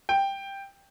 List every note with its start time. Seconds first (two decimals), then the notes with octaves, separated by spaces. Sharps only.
0.09 G5